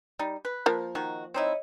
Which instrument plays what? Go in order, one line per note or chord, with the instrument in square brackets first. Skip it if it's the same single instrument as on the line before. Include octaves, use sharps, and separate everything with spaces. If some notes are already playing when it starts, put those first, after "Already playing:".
[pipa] G3 D#4
B4
[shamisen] F3 A#3
[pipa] D#3 D#4 F#4
[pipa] C4 D#4 E4 [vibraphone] C#5 D#5